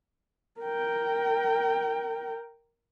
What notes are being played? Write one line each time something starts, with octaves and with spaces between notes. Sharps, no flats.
A#4 G5